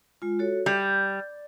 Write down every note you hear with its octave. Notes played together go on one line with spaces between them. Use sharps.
G#3 F4
F#4 A4 C#5
G3 D5